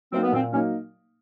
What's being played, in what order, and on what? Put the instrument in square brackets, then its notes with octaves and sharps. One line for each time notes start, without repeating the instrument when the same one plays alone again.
[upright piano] F#3 A#3 D#4 [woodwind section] C4
[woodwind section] B3
[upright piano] A#2 [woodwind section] C4
[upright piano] F#3 A#3 D#4 [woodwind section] C#4